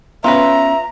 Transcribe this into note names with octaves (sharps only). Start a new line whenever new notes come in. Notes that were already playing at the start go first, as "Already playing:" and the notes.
B3 C#4 F4 B4 E5 A#5